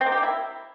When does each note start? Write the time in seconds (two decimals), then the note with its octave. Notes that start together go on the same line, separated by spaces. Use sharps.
0.01 C4
0.06 A#3
0.12 G4
0.17 A#3
0.23 E4